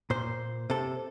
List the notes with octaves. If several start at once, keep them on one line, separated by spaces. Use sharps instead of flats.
A#2 C5
C3 A4